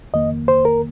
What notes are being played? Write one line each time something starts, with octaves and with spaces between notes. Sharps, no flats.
F2 D#3 A#3 D#5
C5
A#4